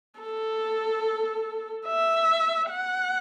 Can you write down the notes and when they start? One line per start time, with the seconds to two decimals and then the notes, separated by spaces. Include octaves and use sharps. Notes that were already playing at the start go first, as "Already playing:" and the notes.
0.20 A4
1.87 E5
2.70 F#5